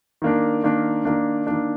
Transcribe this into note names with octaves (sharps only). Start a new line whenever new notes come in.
D#3 A#3 D4
D#3 A#3 D4
D#3 A#3 D4
D#3 A#3 D4